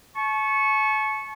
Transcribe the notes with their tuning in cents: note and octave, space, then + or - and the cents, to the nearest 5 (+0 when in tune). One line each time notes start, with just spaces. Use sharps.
A5 -40 C#6 -10